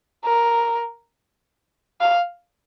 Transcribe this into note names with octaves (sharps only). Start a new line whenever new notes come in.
A#4
F5